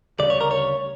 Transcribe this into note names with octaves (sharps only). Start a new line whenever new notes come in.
D2 C#3 G3 D5
C#5
A#4
C#5